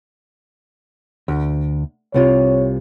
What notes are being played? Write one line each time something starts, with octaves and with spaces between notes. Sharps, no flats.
D2
C2 C3 F4 C#5